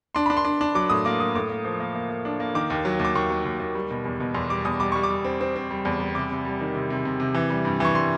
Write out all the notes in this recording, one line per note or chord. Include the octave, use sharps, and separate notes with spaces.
D4 C6
D4 B5
C6
D4
D4
F#3 D6
A2 D#6
A#3 D6
F#3 D#6
A2 D6
A#3
F3
A#3
A#3
A#3
D4
A#3
D#3 D6
D#2
F#3
D#2
D6
D#2 C#6
F#3
D#2
D#2
G3
B2
E2
B2
E2 C6
G3 D6
E2 D#6
G3 D6
G3 C#6
D6
G3
C4
C4
C4
G3
E2
G3
C3 D6
C3
G3
D#3
C3
C3
C3
C3
E3
G3
G2
E3 C#6
G3 C6